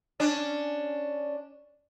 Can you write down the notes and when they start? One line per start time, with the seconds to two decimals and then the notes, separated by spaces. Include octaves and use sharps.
0.20 C#4 D4